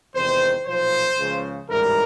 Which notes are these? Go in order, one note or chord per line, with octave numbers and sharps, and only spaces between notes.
E2 C3 D#3 G#3 C5
B1 A#2 F3 C5
C#2 C#3 F3
A1 G#2 E3 G3 A#4